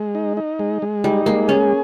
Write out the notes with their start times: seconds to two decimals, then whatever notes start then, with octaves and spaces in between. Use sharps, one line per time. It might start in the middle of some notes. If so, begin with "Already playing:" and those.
Already playing: G#3
0.15 D#4
0.37 D#4
0.59 G#3
0.82 G#3
1.04 G3 D#4
1.26 G#3 A#3
1.48 C#4 G#4